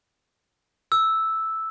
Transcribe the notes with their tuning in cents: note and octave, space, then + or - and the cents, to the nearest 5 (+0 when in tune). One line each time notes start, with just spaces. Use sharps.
E6 -5